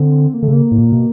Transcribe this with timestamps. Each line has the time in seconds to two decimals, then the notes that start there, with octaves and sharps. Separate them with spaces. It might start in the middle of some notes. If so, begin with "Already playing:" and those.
Already playing: D3 C4
0.34 A#3
0.42 D3 A3
0.48 C#3 A#3
0.72 A2
0.78 A#2
0.92 B2